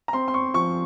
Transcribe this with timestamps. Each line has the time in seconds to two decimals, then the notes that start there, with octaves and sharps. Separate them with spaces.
0.08 A#5
0.13 C4 C6
0.28 C6
0.34 C#6
0.54 F3 C#6